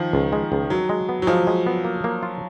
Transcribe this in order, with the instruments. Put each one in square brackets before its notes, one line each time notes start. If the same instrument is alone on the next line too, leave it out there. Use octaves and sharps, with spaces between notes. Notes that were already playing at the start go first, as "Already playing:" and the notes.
Already playing: [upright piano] D#3 F3
[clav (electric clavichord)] C#2
G#3
C#2
[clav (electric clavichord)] D#3 [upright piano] F#3
[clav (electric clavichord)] G#3
B3
[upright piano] F#3
[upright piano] F3 [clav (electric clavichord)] G#3
[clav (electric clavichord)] G#3
B3
A#3
A#3
F4